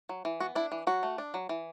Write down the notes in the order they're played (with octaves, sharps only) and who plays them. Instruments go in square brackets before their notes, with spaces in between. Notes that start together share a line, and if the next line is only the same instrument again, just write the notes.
[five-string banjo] F#3
E3
B3 F#4
D4 E4
E3
F#3 F#4
A3
D4
F#3
E3